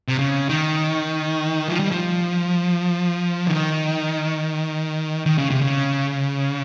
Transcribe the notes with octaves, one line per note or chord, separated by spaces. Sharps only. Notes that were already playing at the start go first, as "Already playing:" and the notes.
C3
C#3
D#3
F3
G3
F3
D#3
D#3
C#3
C3
C#3